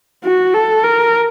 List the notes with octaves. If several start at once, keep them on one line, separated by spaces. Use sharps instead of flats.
F#4
A4
A#4